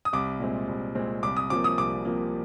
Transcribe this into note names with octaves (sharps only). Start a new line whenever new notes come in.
D#6
C2 D6
A#2 G#3 C4
C2
A#2 G#3 C4
C2 D6
D#6
C3 F3 A#3 D6
D#6
C2 D6
C3 F3 A#3